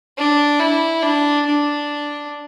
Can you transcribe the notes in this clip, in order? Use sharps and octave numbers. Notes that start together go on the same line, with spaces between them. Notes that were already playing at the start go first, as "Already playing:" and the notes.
D4
E4
D4
D4